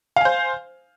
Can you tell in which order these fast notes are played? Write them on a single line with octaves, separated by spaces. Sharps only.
F5 G#5 C5